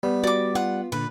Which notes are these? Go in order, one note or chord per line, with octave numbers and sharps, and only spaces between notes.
G3 B3
F#4 D5 D6
F4 F#5
A#2 D3 B4